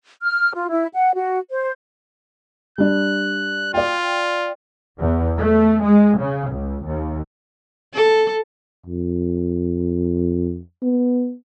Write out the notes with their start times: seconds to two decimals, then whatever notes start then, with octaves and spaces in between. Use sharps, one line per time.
0.22 F6
0.54 F4
0.68 E4
0.94 F#5
1.15 F#4
1.51 C5
2.78 G3 D4 F#6
3.74 F4 D5 G5
4.99 E2
5.38 A3
5.84 G#3
6.19 C#3
6.51 C#2
6.86 D#2
7.94 A4
8.86 F2
10.83 B3